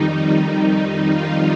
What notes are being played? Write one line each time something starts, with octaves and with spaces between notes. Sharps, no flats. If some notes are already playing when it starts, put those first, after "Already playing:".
Already playing: F2 D#3 G3 D#4
F4